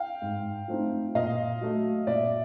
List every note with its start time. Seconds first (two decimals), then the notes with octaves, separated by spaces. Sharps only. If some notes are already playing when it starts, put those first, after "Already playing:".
Already playing: F5 G5
0.22 G#2
0.68 F3 A3 C4 D#4
1.15 A#2 D#5 F5
1.61 F#3 A3
2.07 A#2 D5 E5